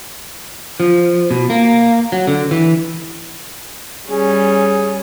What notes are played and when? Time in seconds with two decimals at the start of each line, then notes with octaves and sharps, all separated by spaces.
0.80 F3
1.31 B2
1.50 A#3
2.12 F#3
2.27 D3
2.51 E3
4.09 G3 C#4 G#4